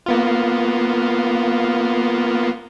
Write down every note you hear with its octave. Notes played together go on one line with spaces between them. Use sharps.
A#3 B3 F4